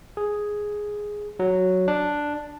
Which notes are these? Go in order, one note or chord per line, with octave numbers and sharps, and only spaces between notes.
G#4
F#3
D4